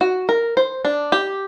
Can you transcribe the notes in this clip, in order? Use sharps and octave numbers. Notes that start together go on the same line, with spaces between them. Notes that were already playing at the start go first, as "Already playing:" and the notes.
F#4
A#4
C5
D4
G4